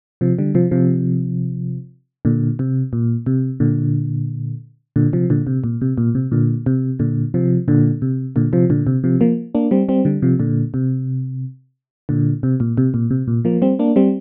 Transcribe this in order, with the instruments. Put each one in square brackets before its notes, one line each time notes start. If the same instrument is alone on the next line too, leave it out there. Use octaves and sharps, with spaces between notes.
[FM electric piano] C3 F3
D3 G3
C3 F3
C3 F3
A#2 D3
C3
A#2
C3
A#2 D3
A#2 D3
C3 F3
A#2 D3
C3
A#2
C3
A#2
C3
A#2 D3
C3
A#2 D3
C3 F3
A#2 D3
C3
A#2 D3
C3 F3
A#2 D3
C3
C3 F3
F3 A#3
A#3 D4
G3 C4
G3 C4
D3 G3
C3 F3
A#2 D3
C3
A#2 D3
C3
A#2
C3
A#2
C3
A#2
F3 A#3
G3 C4
A#3 D4
G3 C4